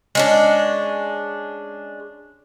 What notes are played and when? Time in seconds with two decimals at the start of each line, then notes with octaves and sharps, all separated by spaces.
0.15 G#3 C#4 D4